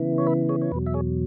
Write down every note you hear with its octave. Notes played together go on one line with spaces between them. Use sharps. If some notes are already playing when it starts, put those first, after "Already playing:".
Already playing: C#3 E3 B3 E4
C#5
B4 E5
G#4 C#5
C#5
E2 B2 F#3 B4
E5
G#4 C#5